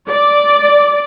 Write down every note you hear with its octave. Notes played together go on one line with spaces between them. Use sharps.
D5